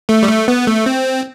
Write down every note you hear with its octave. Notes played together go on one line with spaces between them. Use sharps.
A3
G3
A3
B3
A3
C4